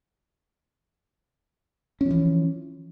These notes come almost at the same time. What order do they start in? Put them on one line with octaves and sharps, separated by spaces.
C#4 F3 E3